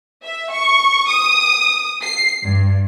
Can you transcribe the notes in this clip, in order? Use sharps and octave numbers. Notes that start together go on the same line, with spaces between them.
E5
C#6
D#6
C7
G2